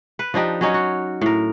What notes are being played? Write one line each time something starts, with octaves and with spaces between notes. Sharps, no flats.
B4
F3 D4 D#4 G4
F#3 C#4 D#4
F#4
A2 A#4